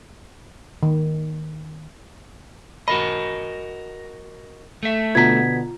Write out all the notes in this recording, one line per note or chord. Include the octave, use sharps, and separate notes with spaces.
D#3
F#4 A#4 D#5 B5
A3 E5
B2 D3 B3 F4 A#5 G#6 B6